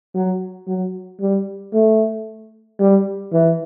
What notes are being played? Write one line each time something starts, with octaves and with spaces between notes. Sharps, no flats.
F#3
F#3
G3
A3
G3
E3